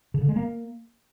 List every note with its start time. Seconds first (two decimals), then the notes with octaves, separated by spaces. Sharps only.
0.14 C#3
0.21 D3
0.29 G#3
0.36 A#3